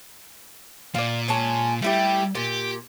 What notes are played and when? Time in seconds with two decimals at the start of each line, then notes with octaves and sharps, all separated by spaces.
0.95 A#2 F4 D5
1.28 G#3 C#4 A5
1.82 G3 A3 E4 G4
2.35 A#2 G4